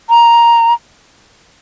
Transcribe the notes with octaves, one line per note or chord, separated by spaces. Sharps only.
A#5